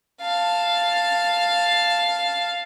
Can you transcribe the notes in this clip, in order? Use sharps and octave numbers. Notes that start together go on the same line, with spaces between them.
F5 A5